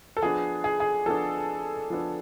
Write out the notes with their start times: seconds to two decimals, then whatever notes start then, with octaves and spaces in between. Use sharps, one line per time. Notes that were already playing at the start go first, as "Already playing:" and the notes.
0.17 A4
0.22 F3 B3 D4 G#4
0.64 G#4
0.80 G#4
1.06 F3 B3 D4 A4
1.90 F3 B3 D4